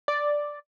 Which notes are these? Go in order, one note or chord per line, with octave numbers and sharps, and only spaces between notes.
D5